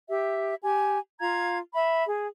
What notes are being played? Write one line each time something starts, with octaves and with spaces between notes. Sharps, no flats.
G4 E5
G4 G#5
F4 F5 A#5 G#6
E5 B5
G#4